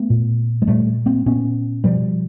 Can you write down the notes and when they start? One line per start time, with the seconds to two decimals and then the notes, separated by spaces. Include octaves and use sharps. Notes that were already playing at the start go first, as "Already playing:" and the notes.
Already playing: A3 B3
0.10 A#2
0.62 G#3
0.67 A#2 G3 A3
1.06 A#3 C4
1.26 A#2 B3 C#4
1.84 B2 F3 G3